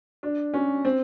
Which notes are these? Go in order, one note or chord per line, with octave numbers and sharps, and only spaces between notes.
D4
C#4
C4